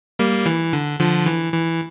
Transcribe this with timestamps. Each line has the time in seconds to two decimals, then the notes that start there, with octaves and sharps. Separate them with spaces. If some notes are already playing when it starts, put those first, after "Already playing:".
0.19 G3 A#3
0.46 E3
0.73 D3
0.99 D3 F3
1.26 E3
1.53 E3